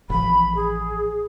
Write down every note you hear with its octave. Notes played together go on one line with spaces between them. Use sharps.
A1 F3 B5
G#4